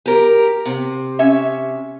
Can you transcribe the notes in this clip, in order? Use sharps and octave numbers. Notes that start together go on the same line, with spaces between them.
G4 A#4
C3
C#4 E5